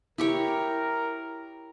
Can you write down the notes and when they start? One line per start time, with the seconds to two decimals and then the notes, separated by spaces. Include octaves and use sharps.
0.18 E4 G4 A#4 C#5